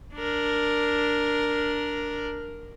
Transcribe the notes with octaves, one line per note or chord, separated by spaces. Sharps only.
D4 A#4